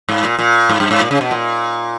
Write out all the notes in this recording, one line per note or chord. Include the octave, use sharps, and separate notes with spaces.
G#2
A#2
A#2
G#2
G2
G#2
A#2
C#3
B2
A#2